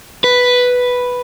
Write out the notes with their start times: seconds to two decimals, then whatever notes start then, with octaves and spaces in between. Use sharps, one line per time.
0.24 B4